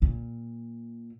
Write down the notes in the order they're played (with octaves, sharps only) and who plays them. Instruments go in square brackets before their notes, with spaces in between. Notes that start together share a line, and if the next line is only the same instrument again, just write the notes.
[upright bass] A#2